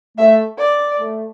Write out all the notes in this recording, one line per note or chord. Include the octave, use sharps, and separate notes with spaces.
A3 E5
D5
A3